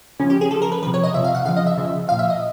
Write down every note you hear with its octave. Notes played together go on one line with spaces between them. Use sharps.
C#3 F3 C#4
G4
G#4
C#3 F3 A4
A#4
B4
C3 F3 B4
C#5
D#5
C3 F3 E5
F5
F#5
C#3 F3 F5
D#5
E5
C#3 F3
A#2 F3 F5
E5
D#5